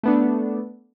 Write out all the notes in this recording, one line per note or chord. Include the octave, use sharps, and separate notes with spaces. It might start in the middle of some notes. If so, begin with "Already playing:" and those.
A3 B3 D4